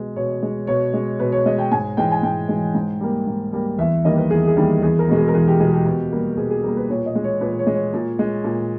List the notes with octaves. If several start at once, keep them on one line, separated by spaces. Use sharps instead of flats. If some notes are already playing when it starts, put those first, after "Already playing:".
Already playing: B2 G#3
B2 C#5
G#3
B2 C#5
G#3
B2 B4
C#5
G#3 D#5
G5
G#2 G#5
E3 G#3 G5
G#5
G#2 G5
E3 G#3
G#2
G3 A#3
G#2
G3 A#3
E2 E5
D#3 G3 A#3 D#5
B4
E2 G#4
G#4
D#3 G3 A#3
E2 G#4
A#4
B2 G#3
G#4
A#4
E2 G#4
G4
B2 G#3 G#4
G4
B2
G3 A#3
B2 G#4
G#4
G3 A#3 A#4
B4
A#2 C#5
D#5
G#3
C#5
A#2 B4
C#5
G#3
C#5
A#2
G#3
A#2